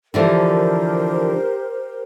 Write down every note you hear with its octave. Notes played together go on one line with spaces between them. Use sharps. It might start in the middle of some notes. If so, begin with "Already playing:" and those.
D3 E3 F3 G4 A#4 C5